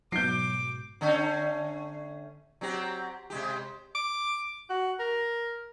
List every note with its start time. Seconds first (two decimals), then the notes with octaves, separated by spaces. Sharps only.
0.12 G#2 B2 F#3 D6 G6 C7
1.01 D3 A3 C#4
2.61 F#3 C4 G4
3.30 C3 G#3 G4
3.95 D6
4.70 F#4
4.99 A#4